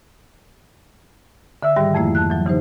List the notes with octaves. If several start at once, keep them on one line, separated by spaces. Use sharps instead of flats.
D3 E5 E6
G#2 D#3 G3 G4 G5
F2 F3 A3 A#3 E4
A5 F#6
E3 F#3
C#3 E3 D#4 G4 C5